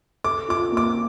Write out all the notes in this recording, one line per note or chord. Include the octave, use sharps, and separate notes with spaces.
A4 D6
F4 D6
A#3
D6